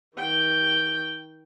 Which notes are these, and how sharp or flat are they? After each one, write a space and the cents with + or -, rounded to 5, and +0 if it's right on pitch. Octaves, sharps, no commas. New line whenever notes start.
D#3 +35 G5 +0